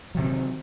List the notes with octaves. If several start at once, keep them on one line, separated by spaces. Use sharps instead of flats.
C3 D#3 F#3